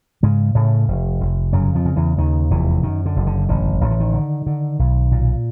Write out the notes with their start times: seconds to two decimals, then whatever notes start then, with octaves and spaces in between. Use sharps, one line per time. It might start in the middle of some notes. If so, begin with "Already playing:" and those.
0.23 G#2 C#3 G#3
0.55 A2 C#3 A3
0.88 F1
1.20 F1
1.53 F#2 C#3 F#3
1.75 F2 F3
1.85 C#3
1.96 E2 E3
2.18 D#2 D#3
2.51 F1 E2 E3
2.83 F#2 D#3
3.06 D3
3.16 F#1
3.27 D3
3.49 A1 D3
3.81 A1 D#3
3.91 D3
4.00 D#3
4.14 D3
4.46 D3
4.79 B1
5.12 A#2